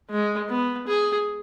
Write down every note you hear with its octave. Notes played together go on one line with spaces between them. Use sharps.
G#3
B3
G#4